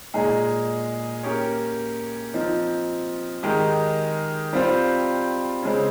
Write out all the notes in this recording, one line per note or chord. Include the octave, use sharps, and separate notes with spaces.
A#2 G#3 D#4 G#4
A#3 C#4 G4 C#5
F3 C4 D#4
D#3 G#3 D#4 G4
G3 C4 F4 C5
C#3 G#3 C4